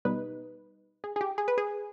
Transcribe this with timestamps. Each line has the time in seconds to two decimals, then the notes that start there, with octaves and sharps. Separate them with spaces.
0.05 B2 G3 B3 D#4 B4
1.04 G#4
1.16 G#4
1.21 G4
1.38 G#4
1.48 B4
1.58 G#4